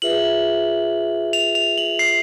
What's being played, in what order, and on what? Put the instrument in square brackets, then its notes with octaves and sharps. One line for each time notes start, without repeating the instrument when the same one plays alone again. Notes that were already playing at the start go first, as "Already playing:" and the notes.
[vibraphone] F4 G#4 B4 E5 [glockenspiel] F#7
[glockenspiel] F7
F7
F#7
C7